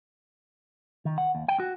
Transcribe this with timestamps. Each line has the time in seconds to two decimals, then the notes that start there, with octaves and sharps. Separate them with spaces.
1.05 D#3
1.18 F#5
1.35 D#2
1.48 G5
1.60 F#4